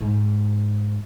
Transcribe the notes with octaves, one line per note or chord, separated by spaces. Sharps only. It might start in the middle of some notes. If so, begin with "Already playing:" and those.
G#2